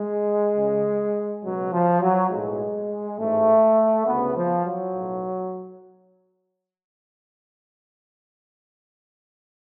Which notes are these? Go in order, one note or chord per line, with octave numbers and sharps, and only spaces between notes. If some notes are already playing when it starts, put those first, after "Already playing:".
Already playing: G#3
C#2 C#3
C#2 B2 F#3
F3
F#3
B1 A2 G#3
A1 G#2 A3
D2 C#3 B3
F3
F#3
B1 A2